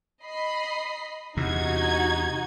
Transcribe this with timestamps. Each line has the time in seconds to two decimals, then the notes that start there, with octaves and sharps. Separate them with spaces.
0.24 D#5 B5 C7
1.37 E2 C3 D#4 F#4 G#6